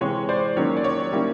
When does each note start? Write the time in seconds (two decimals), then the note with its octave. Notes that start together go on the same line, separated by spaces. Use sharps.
0.01 C3 E3 G#3 C#5
0.29 C5 D5
0.56 D#3 F#3 A#3 C#4 C#5
0.77 D5
0.84 C#5
1.12 D#3 G3 A#3 C#4 E4